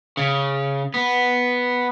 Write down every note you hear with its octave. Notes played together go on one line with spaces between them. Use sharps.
C#3
B3